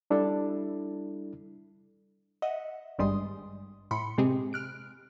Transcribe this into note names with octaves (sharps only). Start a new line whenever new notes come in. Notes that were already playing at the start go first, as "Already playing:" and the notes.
G3 D4 E4 A4
D#5 E5 F#5
G#1 G2 G3 G#3 C6 D#6
A2 B5 C6 C#7
C3 G#3 C4 G4 G#4
F6 F#6 D7